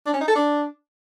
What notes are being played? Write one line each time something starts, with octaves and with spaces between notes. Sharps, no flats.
D4
C#4
D#4
A4
D4